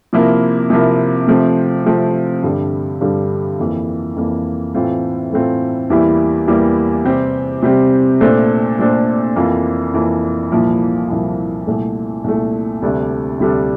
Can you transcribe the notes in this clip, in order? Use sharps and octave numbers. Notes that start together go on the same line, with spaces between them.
C3 F3 A#3 E4 A#4
C3 F3 A#3 E4 A#4
C3 F3 A3 C4
C3 F3 A3 C4
G2 D3 G3
G2 D3 G3
F2 E3 A#3
F2 E3 A#3
A2 E3 A3 C4 F4
A2 E3 A3 C4 F4
E2 E3 G3 A#3 E4
E2 E3 G3 A#3 E4
C3 G3 C4 G4
C3 G3 C4 G4
A#2 A3 D4 A4 C5
A#2 A3 D4 A4 C5
F2 E3 A#3 F4
F2 E3 A#3 F4
C2 A#2 F3 A#3 E4
C2 A#2 F3 A#3 E4
C2 A#2 A3
C2 A#2 A3
D2 C3 G3 D4 A4
D2 C3 G3 D4 A4